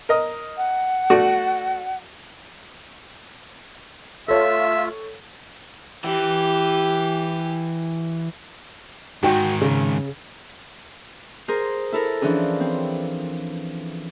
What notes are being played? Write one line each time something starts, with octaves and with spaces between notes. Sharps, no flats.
A#4 D#5
F#5
A3 F#4 D5
A3 F4 A4 C#5 E5
E3 G4
G#2 D#3 F#4 G5
C#3
G#4 A#4 C5
E4 A4 A#4
E3 F3 C#4 D4 G#4
C4